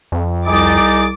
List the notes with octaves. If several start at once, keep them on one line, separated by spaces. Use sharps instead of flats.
F2
C2 D#4 G#4 D6 A6